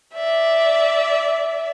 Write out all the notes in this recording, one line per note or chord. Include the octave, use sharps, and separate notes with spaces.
D5 E5